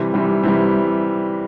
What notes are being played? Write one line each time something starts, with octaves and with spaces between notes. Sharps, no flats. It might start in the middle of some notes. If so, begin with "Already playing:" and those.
Already playing: C3 E3 G3
C3 E3 G3
C3 E3 G3